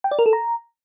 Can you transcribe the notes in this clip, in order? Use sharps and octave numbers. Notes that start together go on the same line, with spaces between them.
G5
D5
A#4
A4
A#5